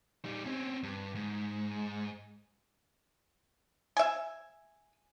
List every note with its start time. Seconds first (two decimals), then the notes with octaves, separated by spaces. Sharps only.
0.25 G3 D#4
0.46 C4 C#4
0.83 G2
1.15 G#2
3.97 E5 G#5